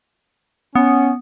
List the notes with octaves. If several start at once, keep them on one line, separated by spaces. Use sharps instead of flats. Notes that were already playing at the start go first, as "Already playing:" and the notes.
B3 C#4